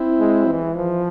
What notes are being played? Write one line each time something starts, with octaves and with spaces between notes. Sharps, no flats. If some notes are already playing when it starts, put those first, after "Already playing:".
Already playing: C4 E4
G#3
E3
F3